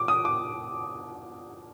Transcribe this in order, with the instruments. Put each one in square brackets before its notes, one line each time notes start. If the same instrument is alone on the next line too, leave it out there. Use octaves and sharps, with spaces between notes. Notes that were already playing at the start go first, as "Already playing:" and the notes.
Already playing: [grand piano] D6
D#6
D6